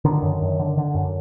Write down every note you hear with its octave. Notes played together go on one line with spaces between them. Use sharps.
D3 D#3
F#2
F#2
D3
D3
F#2